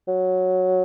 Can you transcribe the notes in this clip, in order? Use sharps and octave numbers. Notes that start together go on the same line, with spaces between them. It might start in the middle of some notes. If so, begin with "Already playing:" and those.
F#3